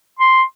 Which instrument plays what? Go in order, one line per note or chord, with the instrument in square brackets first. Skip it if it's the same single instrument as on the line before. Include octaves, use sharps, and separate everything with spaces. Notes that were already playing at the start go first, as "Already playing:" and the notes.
[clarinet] C6